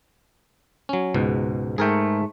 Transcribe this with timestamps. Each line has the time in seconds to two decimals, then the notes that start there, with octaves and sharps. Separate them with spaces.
0.89 F#3 C#4
1.14 C#2 G#2 B2
1.78 G#2 A3 G#4 A#4 G5